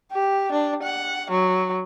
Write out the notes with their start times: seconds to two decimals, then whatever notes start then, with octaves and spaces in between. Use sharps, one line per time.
0.12 G4
0.52 D4
0.83 F#5
1.31 F#3